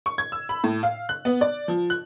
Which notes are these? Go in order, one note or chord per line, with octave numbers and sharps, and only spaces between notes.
C#6
G#6
E6
B5
A2
F5
F#6
B3
D5
F3
F#6